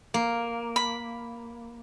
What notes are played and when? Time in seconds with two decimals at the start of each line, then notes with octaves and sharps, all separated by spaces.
0.14 A#3
0.76 B5